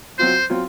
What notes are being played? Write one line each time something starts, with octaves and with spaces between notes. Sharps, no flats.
F#3 C4 F4 C5
F#3 C4 F4